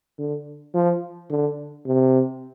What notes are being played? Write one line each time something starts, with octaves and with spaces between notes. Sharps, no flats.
D3
F3
D3
C3